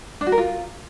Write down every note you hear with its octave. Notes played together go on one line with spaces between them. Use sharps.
D4
F#4
A#4
F4